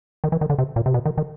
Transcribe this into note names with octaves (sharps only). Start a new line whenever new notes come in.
D#3
E3
D#3
D3
C3
A#2
C3
B2
D#3
D#3